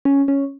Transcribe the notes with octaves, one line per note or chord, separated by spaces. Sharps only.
C#4
C#4